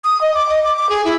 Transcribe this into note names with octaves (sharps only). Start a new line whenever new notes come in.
D#6
D#5
D6
D#5
D6
D6
G#4
E4